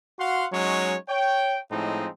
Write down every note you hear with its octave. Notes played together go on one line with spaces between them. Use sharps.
F#4 F5 F#5 C6
F#3 G#3 C#4 D#4 C#5
C#5 G5
A2 F3 G#3 C4 D#4